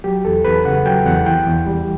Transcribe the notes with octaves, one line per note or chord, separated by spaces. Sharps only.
F#3 G4
E2 A4
E2 B4
C#3 F#5
F#3 G5
E2 F#5
E3 G5
E2
G3